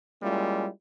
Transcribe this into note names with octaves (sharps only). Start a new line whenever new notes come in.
G3 G#3 A#3 C#4 E4 F4